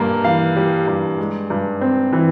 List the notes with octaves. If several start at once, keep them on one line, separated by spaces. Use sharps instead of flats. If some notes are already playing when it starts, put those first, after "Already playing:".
Already playing: G2 G3 A#3
E3 F5
G3
G2
G#3
G2
C4
E3